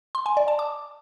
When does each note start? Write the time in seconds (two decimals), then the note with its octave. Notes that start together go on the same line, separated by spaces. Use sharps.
0.15 C6
0.26 G#5
0.37 D5
0.48 A5
0.59 D6